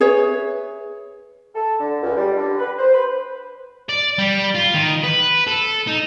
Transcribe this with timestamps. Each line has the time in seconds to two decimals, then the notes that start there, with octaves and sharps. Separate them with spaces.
0.01 G#4 B4 C#5 E5
1.55 A4
1.80 D3
2.02 C#2
2.17 G3
2.37 D3
2.59 B4
2.79 C5
2.94 B4
3.89 D5
4.19 G3
4.55 F4
4.74 D#3
5.03 B4
5.47 A4
5.87 D#4